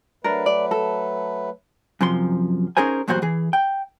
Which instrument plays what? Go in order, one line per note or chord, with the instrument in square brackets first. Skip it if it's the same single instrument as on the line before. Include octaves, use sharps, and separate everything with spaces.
[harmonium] F#3 A3 B4 [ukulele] D4 A#4
[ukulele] D5
A4
[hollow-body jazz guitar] F#2 C3 F3 C6
C#4 D#4 G#4 A#4 C5 G#5
E2 G2 A#2 F#3 F#4 C5
E3 G#4
G5